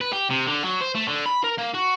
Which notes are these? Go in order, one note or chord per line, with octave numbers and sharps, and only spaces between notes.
B4
G4
C3
D3
F#3
C5
A3
D3
B5
A#4
A#3
F#4